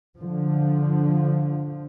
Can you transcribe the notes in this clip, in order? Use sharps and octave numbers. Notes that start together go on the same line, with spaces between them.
D3 F3